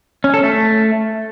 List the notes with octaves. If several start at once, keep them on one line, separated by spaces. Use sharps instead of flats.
C#4
A4
A3